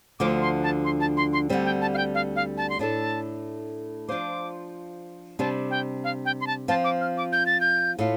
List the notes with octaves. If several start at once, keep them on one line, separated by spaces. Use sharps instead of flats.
D2 D3 F3 D4 D6
C6
A5
C6
A5
C6
C6
D2 D3 G3 C4
G5
A5
F5
G5
F5
F5
A5
C6
A2 A3 D4 A4 A5
F3 D4 F4 C5 D6
C3 G3 D4 A5
G5
F5
G5
C6
A5
F3 C4 F4 A5
D6
F6
D6
G6
A6
G6
A2 A3 F4